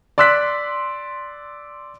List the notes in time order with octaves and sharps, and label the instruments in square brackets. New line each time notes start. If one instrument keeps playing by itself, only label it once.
[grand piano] D5 C6 E6 F#6 B6